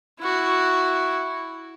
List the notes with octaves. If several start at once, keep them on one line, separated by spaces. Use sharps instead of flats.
E4 F#4